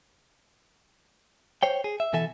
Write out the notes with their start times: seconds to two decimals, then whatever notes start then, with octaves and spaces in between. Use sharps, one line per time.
1.63 C5 C#5 G5
1.84 G#4
2.00 E5
2.13 B2 E3 A4 E5 G#5